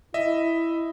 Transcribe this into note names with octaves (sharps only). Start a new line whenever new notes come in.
E4 D#5 E5